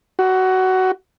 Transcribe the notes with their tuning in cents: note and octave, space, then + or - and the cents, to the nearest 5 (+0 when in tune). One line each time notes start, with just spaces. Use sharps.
F#4 +15